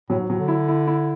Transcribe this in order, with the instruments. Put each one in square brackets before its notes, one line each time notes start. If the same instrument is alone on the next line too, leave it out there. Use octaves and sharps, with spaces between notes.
[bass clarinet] A2 [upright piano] F#3
[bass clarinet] G#2
[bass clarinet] A2 [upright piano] F#3
[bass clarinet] D3
[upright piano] E4
E4
E4